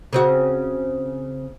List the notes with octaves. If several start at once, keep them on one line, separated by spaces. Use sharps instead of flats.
C#3 C4 F#4